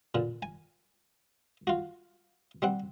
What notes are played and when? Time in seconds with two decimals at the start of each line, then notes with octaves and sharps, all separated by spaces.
0.15 A#2 D3
0.42 G#5
1.67 F4 F#4
2.62 G3 C4 F#5